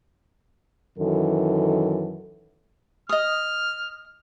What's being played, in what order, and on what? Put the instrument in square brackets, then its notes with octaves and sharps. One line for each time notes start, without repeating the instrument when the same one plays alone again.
[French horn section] F#2 D#3 E3 A4
[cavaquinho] D#5 D#6 [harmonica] F6